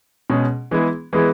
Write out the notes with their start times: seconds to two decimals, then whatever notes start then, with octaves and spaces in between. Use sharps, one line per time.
0.30 B2 G#3 C#4 G#4
0.71 E3 G#3 B3 E4 G#4
1.13 E3 G#3 B3 E4 G#4